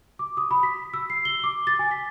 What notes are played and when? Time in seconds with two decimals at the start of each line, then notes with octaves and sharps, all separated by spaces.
0.19 D6
0.37 D#6
0.51 B5
0.63 B6
0.94 E6
1.10 C7
1.25 G7
1.44 D6
1.67 A6
1.79 G#5
1.91 B6